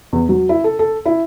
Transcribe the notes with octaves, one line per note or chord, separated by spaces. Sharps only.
E2
F#3
E4
A4
A4
E4